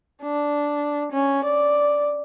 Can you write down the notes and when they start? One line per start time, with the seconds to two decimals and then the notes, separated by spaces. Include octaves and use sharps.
0.23 D4
1.12 C#4
1.44 D5